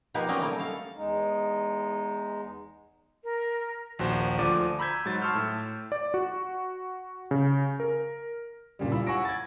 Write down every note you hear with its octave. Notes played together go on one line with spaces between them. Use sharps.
B2 F3 A#3 D#4 G4 B4
F#3 A#3 C4 C#4 D5 D#5
F#3 G3 A3 A#3 C#4
A4 F5
E2 G#3 D#4
A#4
A#1 D#2 F#4 C5
D2 F3 D5 D6 D#7
A#5 B5 E6 G6 G#6 B6
G#2 F#3 A6
A5 C6 C#6 E6 F6 G6
A2
D5
F#4
C#3
A#4
G2 A#2 C#3 G3
E4 F4 B5 E6
F#5 G#5 C#6 E6 A#6 D7
G#6 A6